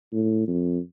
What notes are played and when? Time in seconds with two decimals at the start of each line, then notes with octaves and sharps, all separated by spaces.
0.12 A2
0.47 F2